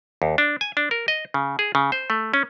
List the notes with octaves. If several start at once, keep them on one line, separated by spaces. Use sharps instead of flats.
D#2
D4
G#5
D4
A#4
D#5
C#3
G#4
C#3
C5
A3
C#4